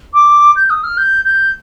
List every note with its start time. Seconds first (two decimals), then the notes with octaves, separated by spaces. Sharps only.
0.14 D6
0.56 G6
0.70 D#6
0.84 F6
0.97 G6
1.25 G6